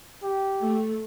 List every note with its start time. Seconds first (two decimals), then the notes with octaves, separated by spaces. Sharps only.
0.23 G4
0.58 A3